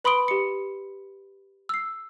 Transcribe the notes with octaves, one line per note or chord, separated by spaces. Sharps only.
B4 B5 C6 D#6 D7 G7
G4 C#7
E6 C7